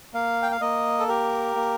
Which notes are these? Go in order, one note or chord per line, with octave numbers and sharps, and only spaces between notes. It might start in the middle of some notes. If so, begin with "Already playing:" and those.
A#3 F5
G5
F5
A#3 D#5
A4
G4 A#4
A#3